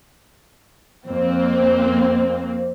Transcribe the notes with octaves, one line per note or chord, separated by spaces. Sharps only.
F2 A#3 C4